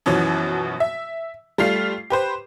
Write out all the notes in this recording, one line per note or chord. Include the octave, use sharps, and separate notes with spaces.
F#2 B2 E3 F3 C#4
E5
G3 A3 F4 C7
G4 B4 C5